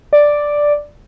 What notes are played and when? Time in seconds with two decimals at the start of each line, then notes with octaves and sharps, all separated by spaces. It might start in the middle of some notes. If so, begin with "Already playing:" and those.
0.13 D5